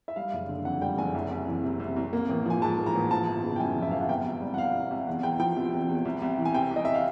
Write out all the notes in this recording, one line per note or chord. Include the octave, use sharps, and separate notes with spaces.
E5
G3 F5
F#1
D3
F2 F#5
G3 G5
F#1 G#5
C2
C2
E3
C3
C2
C2
A#3
A1
F3 G#5
G#2 A5
A#3
A#5
A1
F3 A5
G1
C#3
G5
F#2 G#5
F3
E5
G1 F5
F#5
C2 G5
C2
G3
F#5
B2 F5
C2
C2
E2 F#5
E2 G5
F3 G5
C3
E2
E2
C2
C2
E3
G#5
C3 G5
C2
D#5
E5
F5